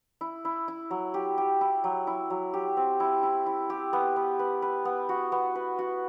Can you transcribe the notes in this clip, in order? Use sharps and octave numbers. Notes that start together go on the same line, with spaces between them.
E4
E4
E4
F#3
G4
G4
E4
F#3
E4
F#3
G4
C4
E4
E4
E4
G4
B3
B3
B4
B4
B3
F#4
B3
B4
F#4